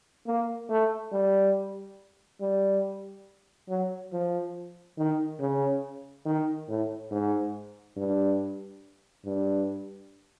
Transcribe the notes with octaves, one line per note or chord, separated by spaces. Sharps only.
A#3
A3
G3
G3
F#3
F3
D#3
C#3
D#3
A2
G#2
G2
G2